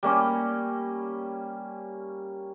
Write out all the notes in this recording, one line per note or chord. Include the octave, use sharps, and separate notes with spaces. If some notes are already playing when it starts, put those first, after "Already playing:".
G3 A#3 C#4